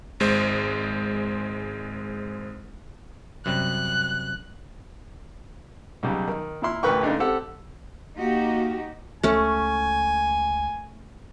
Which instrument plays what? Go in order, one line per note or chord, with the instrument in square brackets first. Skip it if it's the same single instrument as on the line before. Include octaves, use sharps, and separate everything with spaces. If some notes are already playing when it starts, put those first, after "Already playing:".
[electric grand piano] G#1 G#3 C5
[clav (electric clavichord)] F#2 C3 G3 [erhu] F#6
[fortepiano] B1 C#3 G3
D#3
A#2 E4 C6 F6
A1 D2 A#4 B4 G5 C#6
C#3 G#3 A3 D4 D#4
C4 G4 A4 F#5
[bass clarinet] A#3 [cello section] D#4 F#4 G4
[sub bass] C#2 [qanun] A3 C#4 [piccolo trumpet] G#5